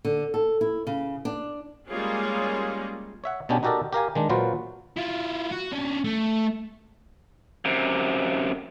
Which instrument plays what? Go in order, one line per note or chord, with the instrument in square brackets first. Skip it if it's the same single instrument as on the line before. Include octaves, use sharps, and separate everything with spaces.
[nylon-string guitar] D3
A4
E4
C#3
D4
[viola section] G3 G#3 A#3 C#4 F4 G#4
[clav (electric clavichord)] C#5 E5 F#5
B2 B3 C#4 D4 G4 G#4
D#4 F#4 G4 A4 A#4 D5
G4 A#4 F5 G#5
D#3 G#3 D4
A#2 F#3 F4 F#4 B4 C5
[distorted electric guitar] E4 F4
F#4
C#4 D4
A3
[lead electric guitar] F#2 C3